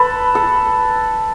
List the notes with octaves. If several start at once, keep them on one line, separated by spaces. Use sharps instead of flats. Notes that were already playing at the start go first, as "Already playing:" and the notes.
Already playing: A4 B4
A4